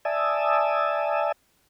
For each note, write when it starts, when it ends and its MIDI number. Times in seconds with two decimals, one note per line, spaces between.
0.05 1.32 74
0.05 1.32 76
0.05 1.32 80
0.05 1.32 81
0.05 1.32 87
0.05 1.32 88